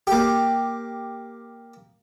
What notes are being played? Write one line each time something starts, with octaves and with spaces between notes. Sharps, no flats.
A#3 G4